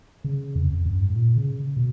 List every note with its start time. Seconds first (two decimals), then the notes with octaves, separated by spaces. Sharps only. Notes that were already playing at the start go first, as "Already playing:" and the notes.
0.24 C#3
0.56 F2
0.70 F2
0.86 F#2
1.01 G#2
1.16 A#2
1.36 C#3
1.77 B2